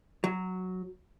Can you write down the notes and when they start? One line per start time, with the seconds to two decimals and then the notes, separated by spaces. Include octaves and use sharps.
0.24 F#3